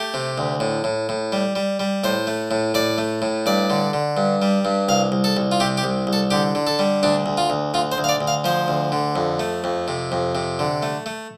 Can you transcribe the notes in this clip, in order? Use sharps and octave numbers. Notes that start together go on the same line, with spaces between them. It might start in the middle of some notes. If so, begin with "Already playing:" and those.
Already playing: A3 G4
C3
D2
A2
A2
A2
G3
G3
G3
A2 C5
A3
A2
A2 D5
A3
A2
G2 D5
D3
D3
G2
G3
G2
C2 F5
C2
A4
C2
F4
C3 G4
G4
C2
C2
A4
D3 G4
D3
A4
G3
D2 D4
D2
F4
D2
D2 F4
C5
D2
F5
D5
D2
F5
F3 C5
D2
D3
F2
A3
F2
C3
F2
C3
D3
A3
A3